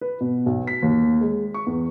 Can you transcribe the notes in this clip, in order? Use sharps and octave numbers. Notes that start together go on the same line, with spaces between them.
B4
B2
B1
B6
D#2
G#3
C#6
E2